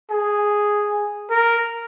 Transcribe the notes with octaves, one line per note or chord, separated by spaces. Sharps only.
G#4
A#4